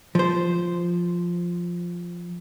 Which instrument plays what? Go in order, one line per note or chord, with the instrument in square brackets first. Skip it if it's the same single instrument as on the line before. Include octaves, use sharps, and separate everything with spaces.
[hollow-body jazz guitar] F3 C5